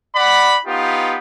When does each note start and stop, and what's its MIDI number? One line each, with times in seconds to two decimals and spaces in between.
0.15 0.56 74
0.15 0.56 78
0.15 0.56 83
0.65 1.18 59
0.65 1.18 63
0.65 1.18 65
0.65 1.18 67